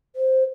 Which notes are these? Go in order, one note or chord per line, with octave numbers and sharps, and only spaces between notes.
C5